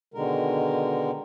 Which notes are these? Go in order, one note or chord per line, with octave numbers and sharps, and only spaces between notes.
B2 D3 D#3 G#3 A#4